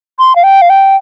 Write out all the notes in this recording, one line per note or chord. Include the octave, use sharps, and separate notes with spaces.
C6
F5
G5
F5
G5